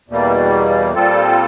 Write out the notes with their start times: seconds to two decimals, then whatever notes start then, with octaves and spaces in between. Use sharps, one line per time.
0.08 E2 B2 G3 A#3
0.94 A#2 G3 C4 F4 A4